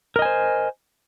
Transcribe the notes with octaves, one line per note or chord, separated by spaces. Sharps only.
A#4 C5 D#5 G#5